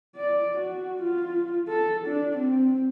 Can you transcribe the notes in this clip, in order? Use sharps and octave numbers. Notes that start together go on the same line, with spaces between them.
D5
F#4
F4
A4
D4
C4